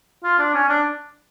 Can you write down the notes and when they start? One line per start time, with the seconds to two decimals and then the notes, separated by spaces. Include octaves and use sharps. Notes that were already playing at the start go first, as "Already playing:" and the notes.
0.24 F4
0.39 D4
0.54 C#4
0.69 D4